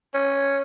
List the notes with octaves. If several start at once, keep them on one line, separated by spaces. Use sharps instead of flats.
C#4